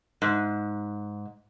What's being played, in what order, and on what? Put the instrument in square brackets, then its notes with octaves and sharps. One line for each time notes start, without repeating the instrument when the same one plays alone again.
[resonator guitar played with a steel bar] G#2